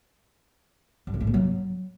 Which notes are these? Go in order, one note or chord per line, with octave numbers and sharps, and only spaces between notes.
G2
E3
A2
A#3
F#3